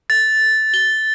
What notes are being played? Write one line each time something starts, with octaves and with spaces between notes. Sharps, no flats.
A6
G7